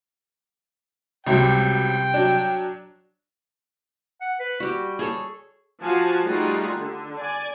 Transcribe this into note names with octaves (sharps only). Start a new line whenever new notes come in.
C#2 C3 F#3 G3 G5
F#3 D4
F#5
B4
G3 F#4 G4
G#4 A4 C#5
F3 F#4 F5 G#5 A5
G3 A3 D#4 F4 F#4 G#4
D3
D5 G#5